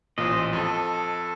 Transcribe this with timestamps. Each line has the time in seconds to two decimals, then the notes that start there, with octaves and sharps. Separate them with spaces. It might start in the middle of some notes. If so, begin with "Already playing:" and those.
0.18 A1 A#2 C5 D#5
0.53 F2 A4